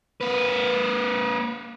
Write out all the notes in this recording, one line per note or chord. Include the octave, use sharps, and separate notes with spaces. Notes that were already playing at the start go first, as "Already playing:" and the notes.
A#3 B4